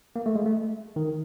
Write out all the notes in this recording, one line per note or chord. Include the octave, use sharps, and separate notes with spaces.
A#3
A3
G#3
A3
D#3